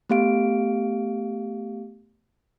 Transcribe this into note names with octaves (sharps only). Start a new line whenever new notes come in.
A3 B3 G4 F5 D7